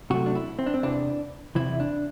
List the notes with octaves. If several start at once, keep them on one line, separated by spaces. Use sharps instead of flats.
C3 F#3 A3 F#4
D4
E4
C4
D4
C4
E2 C3 E3 D4
E2 C3 E3 E4
D4